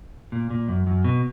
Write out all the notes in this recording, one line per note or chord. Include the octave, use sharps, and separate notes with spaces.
A#2
A#2
F#2
F#2
B2